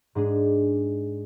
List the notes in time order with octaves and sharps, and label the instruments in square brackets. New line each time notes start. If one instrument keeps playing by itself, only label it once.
[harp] G#2 G#3 D4 G#4